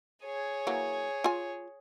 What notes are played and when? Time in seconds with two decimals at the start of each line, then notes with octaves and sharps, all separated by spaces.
0.25 G#4 C#5
0.67 E3 F#3 A#3
1.24 F4 G#5